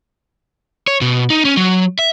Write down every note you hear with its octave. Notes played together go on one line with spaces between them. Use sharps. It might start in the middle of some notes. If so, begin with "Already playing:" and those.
C#5
B2
D#4
C#4
F#3
E5